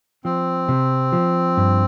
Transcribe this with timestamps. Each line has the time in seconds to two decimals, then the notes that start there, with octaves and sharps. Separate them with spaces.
0.25 F3 C4
0.68 C3
1.12 F3
1.57 G2